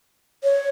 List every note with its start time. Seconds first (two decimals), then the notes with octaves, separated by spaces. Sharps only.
0.43 C#5